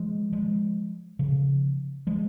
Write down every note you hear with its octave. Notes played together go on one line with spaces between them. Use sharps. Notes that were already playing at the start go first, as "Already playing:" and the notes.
Already playing: F3 G#3
F3 G#3
C#3 F3
F3 G#3